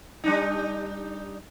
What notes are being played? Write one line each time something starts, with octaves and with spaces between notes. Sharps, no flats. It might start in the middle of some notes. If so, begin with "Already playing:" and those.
G3 D4 D#4